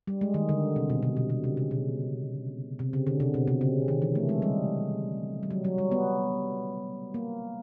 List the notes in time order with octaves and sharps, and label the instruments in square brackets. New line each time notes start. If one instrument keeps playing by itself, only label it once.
[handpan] G3
G#3
D#3
D3
C3
B2
C3
B2
C3
C#3
C#3
B2
C3
C#3
D3
C3
B2
C3
C#3
D#3
E3
A3
G#3
G3
G3
F#3
F#3
G3
B3
A#3